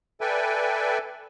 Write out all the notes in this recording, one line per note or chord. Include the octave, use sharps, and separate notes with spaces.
A4 B4 D5 E5 G5 G#5